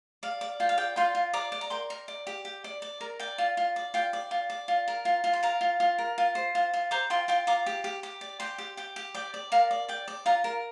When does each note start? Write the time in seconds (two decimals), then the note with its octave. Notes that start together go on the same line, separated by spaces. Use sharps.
0.23 D5 F5
0.41 D5
0.60 F4 G5
0.69 F5
0.78 D5 G5
0.96 F4 G5 C6
1.15 F4
1.33 D5 A#5 D6
1.52 D5
1.61 A#5
1.70 A#4 G5 C6
1.90 A#4
2.08 D5
2.27 G4
2.45 G4
2.64 D5
2.82 D5
3.01 A#4
3.20 D5 G5
3.38 F4
3.57 F4
3.76 D5
3.94 F4 G5
4.13 D5
4.31 F4
4.50 D5
4.68 F4
4.88 A#4
5.05 F4
5.24 F4
5.33 C6
5.43 A#4 F5 A#5
5.61 F4
5.80 F4
5.99 A#4
6.18 F4
6.35 C5
6.55 F4
6.74 F4
6.91 C5 A#5 D6
7.10 F4 G5 C6
7.28 F4 G5 C6
7.47 F4 A#5 D6
7.66 G4
7.84 G4
8.03 G4
8.21 D5
8.40 G4 G5 C6
8.58 G4
8.77 G4 G5
8.96 G4
9.15 D5 G5
9.34 D5
9.52 A#4 F5
9.71 D5
9.88 D5 G5
10.08 D5
10.26 F4 F5 A#5
10.44 A#4